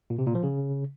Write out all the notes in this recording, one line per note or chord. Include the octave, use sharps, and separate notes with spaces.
A#2
C3
A#2
F3
C#3